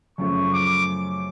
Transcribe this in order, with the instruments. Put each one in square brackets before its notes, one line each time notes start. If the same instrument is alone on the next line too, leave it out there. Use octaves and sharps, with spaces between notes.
[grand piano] F#2 C#3 F3 A3 [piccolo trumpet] C#6
[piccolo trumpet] D6